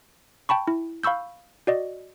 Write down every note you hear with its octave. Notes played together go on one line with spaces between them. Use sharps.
G5 A5 B5 C#6
E4
F5 B5 C#6 E6 G6
F#4 D5 D#5